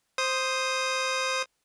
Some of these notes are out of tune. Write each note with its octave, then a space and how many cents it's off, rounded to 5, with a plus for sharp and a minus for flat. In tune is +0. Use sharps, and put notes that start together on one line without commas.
C5 +0 D#6 +0